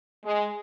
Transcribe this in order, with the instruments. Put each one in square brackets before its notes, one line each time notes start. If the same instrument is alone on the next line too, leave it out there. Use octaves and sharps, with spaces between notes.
[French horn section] G#3